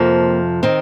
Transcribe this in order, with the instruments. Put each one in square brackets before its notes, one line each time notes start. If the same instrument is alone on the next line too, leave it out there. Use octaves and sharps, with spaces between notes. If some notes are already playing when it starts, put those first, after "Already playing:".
Already playing: [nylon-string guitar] F2 C3 F3 A#3
D#3 C4